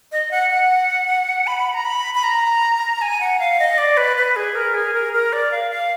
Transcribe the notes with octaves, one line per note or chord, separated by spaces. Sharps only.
D#5
F#5
F#5
B5
A#5
B5
B5
A#5
G#5
F#5
F5
D#5
D5
B4
B4
G#4
A#4
G#4
A#4
A#4
D5
F5
F5